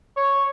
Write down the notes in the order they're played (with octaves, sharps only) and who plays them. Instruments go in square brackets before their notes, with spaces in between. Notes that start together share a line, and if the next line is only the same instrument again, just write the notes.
[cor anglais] C#5